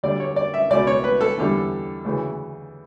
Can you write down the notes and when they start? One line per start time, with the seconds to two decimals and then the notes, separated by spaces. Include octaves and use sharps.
0.03 D2 D3 G3 D5
0.20 C#5
0.36 D5
0.54 E5
0.70 C#2 B2 A3 D5
0.87 C#5
1.04 B4
1.21 A4
1.38 E2 D3 G3
2.05 D2 C#3 E3 A3